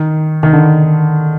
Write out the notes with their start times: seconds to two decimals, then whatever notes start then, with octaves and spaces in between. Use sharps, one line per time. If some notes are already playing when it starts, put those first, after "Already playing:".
Already playing: D#3
0.43 D#3
0.53 D3